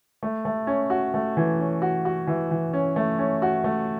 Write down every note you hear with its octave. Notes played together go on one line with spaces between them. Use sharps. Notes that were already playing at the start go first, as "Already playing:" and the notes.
A3
A3
C#4
F#4
A3
E3
C#4
F#4
F#4
E3
E3
C#4
A3
C#4
F#4
A3